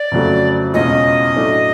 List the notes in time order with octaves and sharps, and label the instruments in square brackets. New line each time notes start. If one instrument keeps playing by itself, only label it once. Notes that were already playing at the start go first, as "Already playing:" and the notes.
Already playing: [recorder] D5
[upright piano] F2 C#3 F#3 A3
[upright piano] E2 B2 G#3 C#4 F4 [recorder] D#5
[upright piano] A2 F#3 A3 D4